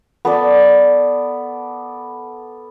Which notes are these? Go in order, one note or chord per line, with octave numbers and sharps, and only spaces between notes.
B3 A4 D5